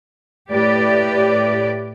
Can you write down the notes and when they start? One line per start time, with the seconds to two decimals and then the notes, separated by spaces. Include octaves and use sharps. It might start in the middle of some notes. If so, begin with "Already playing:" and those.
0.51 A2 G4 B4 D5